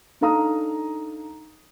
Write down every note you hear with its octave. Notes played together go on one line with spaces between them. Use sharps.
D4 D#4 A4 F5 A#5 D#6